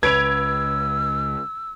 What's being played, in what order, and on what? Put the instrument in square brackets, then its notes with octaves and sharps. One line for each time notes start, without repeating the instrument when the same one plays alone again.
[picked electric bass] C#2 [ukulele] B4 [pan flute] E6 [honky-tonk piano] G#6 D7 F7